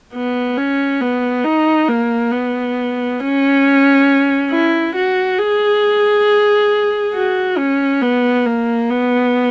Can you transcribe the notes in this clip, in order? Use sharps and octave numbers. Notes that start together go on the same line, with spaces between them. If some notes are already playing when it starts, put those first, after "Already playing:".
B3
C#4
B3
D#4
A#3
B3
C#4
E4
F#4
G#4
F#4
C#4
B3
A#3
B3